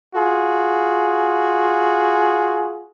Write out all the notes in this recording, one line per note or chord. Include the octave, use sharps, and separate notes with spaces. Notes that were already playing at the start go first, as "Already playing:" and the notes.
F4 F#4 G#4